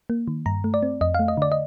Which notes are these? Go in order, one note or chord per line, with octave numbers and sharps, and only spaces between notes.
A#3
D#3
G2 A#5
A3
D5
C4
F2 D#5
F5
A3
D#5
D3 D5
D#5